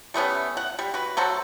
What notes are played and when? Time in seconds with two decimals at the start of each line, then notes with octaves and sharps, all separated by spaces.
0.14 G3 A3 B3 C#4
0.57 F#5
0.79 G3
0.94 F#4 B4
1.17 F#3 F#4 A4 C5